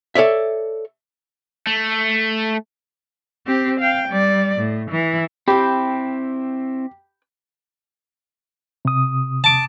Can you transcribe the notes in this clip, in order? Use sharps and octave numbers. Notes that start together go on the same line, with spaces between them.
A4 C#5 D5 E5
A3
C4 G4
F5 G5
G3 D5
A2
E3
C4 E4 G4 G5 B5
C3 D#6
A5 D6